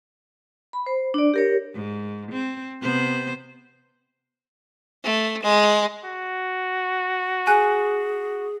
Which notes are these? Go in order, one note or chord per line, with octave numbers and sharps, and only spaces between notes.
B5
C5
D4 D5
G4 A#4 C#5
G#2
C4
C3 B3 C5
A3
G#3
F#4
G#4 G#5 F#6